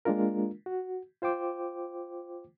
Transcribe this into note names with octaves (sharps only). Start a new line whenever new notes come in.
G#3 A#3 D4 F4 A#4
F#4
F4 C5 G5 D6